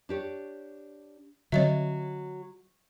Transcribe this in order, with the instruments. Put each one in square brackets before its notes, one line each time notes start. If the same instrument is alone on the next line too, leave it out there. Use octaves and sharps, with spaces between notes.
[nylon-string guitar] D4 G4 C#5
[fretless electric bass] D3 C4 [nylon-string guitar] F#3 [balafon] C#5 D#5 E5